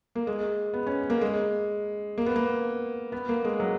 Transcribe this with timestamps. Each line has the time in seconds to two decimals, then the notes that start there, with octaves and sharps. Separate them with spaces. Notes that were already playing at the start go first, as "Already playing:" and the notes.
0.15 A#3
0.27 G#3
0.73 B3
0.87 C#4
1.10 A#3
1.21 G#3
2.18 A#3
2.26 B3
2.36 A#3
3.12 B3
3.29 A#3
3.45 G#3
3.60 F#3